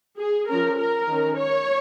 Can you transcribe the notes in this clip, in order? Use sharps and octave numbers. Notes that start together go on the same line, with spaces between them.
G#4
F3 C#4 A#4
A#4
D#3 C#4
C#5